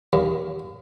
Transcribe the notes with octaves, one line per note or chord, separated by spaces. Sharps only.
D#2